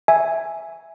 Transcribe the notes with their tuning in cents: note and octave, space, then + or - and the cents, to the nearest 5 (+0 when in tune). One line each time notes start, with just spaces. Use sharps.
E5 +0 G#5 +0